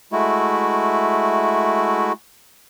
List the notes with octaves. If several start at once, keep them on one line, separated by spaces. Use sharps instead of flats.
G#3 A3 E4 F#4